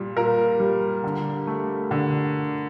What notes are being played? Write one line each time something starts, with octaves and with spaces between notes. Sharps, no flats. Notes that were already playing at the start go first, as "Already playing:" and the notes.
Already playing: A#2 G3
A#2 A#4
G3
D3
A3
D3